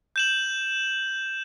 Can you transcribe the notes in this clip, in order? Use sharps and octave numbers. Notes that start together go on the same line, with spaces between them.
G6 E7 F#7